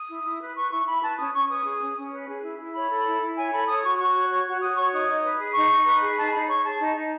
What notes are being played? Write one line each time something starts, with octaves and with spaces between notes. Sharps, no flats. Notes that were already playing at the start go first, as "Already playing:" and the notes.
Already playing: D#6
E4
E4
B4
B4 C#6
E4 C#6
E4 B5
B4 A5
C#4 D#6
C#4 C#6
B4 D#6
G#4
C#4
C#4
B4
G#4
E4
E4
C#5 B5
A4
E4
E4
C#5 G#5
A4 B5
C#5 D#6
F#4 C#6
F#4 C#6
C#5
C#5
F#4
F#4 D#6
C#5 C#6
D#4 D#6
D#4
B4
G#4
D#4 C#6
D#4
B4
G#4
D#4 A5
D#4 B5
C#5 C#6
G#4 A5
D#4
D#4